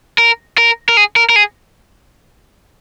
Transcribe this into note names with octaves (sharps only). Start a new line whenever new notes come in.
A#4
A#4
A#4
G#4
A#4
A#4
G#4